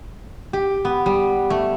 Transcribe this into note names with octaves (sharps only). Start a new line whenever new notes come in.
G4
B3
G3
A3